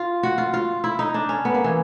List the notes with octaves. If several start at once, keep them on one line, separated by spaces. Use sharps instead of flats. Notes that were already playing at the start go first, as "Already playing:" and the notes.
Already playing: F4
F#4
F4
F4
E4
D#4
D4
C#4
B3
A#3
E3